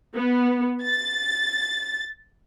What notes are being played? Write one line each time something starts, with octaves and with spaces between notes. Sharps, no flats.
B3
A6